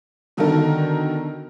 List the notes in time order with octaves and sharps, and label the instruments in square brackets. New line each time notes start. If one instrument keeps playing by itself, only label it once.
[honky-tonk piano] B2 D3 D#3 D#4 A4 A#4